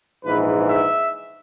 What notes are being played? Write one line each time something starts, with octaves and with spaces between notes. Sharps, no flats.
A#1 G#2 E3 B4
E5